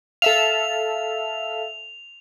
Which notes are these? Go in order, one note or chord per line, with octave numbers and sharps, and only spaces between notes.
A4 E5 F5 F7